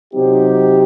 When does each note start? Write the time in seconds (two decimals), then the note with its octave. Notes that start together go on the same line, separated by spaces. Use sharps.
0.13 C3 F#3 C4 D#4 G4